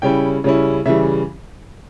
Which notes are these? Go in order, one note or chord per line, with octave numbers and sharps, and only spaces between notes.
C#3 G3 C#4 E4 G5
C#3 G3 C#4 E4
C#3 E3 G3 E5